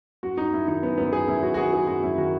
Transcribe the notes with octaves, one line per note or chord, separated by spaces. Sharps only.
F#2 F#4
F#2 D#4
F#2 E4
D#3 D#4
F#2 B3
F#2 B3
F#3 G#4
F#2 E4
F#2 F#4
F#4
D#3 G#4
F#3 G#4
F#2 F#4
F#2 E4
D#3 F#4